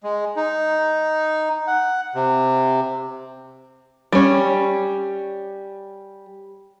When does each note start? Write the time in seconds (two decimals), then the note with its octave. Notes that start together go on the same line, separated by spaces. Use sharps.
0.04 G#3
0.37 D#4
1.67 F#5
2.15 C3
4.12 G3 C#4